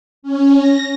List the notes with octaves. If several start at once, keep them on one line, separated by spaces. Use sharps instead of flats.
C#4
A#6